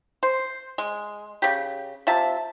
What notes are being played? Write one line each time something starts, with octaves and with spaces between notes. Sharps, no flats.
C5
G#3
C#3 G4
C3 F4 E5 A5